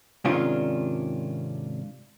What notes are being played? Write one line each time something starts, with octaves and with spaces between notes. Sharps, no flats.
G#2 C3 D#3 C#4 D4 F4